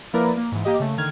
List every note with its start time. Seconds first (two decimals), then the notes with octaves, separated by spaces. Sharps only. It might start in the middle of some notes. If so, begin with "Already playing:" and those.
0.13 F3 A#3 E4 A#4 B4 D5
0.37 A#3
0.52 G#2 E3
0.65 A#3 G4 D#5
0.80 C#3 A3
0.97 D3 D#3 F6 G#6